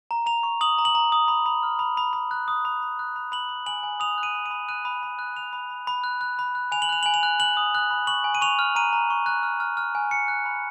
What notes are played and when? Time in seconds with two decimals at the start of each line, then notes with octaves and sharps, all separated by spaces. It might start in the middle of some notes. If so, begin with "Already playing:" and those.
0.11 A#5
0.26 A#5 F7
0.43 C#6
0.61 D#6 F#7
0.78 A#5
0.85 F#7
0.95 A#5
1.12 D#6
1.28 B5
1.46 B5
1.63 F6
1.79 B5
1.97 B5
2.13 B5
2.31 F#6
2.48 D#6
2.65 B5
2.82 B5
2.99 F#6
3.16 B5
3.32 B5 F#7
3.49 B5
3.66 G#5 F#7
3.83 G#5
4.00 D#6 F7
4.18 F#6
4.23 D#7
4.35 B5
4.46 D#7
4.51 B5
4.69 F#6 D#7
4.85 B5
5.03 B5
5.19 F#6
5.37 B5 F7
5.53 B5
5.70 B5
5.87 B5
6.04 F#6
6.21 F#6
6.39 B5
6.55 F#6
6.72 G#5 F7
6.82 F#7
6.89 F#6 F7
7.03 G#5 F#7
7.14 F7
7.23 F#6
7.40 F#6 F#7
7.57 D#6
7.75 F#6
7.91 B5
8.07 C#6 F#7
8.24 G#5
8.35 D#7
8.42 C#6 F7
8.59 F6
8.75 A#5 D#7
8.93 A#5
9.10 C#6
9.26 F#6
9.43 F6
9.60 F6
9.77 F6
9.95 G#5
10.11 F#6 C#7
10.28 F#6
10.45 B5